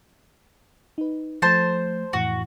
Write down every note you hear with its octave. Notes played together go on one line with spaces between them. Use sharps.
D#4 B4
F3 A3 C5 A5
F2 A2 E3 F#4